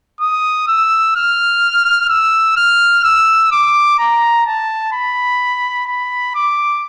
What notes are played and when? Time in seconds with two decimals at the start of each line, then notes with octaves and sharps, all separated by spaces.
0.21 D#6
0.68 E6
1.16 F6
2.09 E6
2.57 F6
3.04 E6
3.52 D6
3.99 A#5
4.46 A5
4.93 B5
5.87 B5
6.35 D6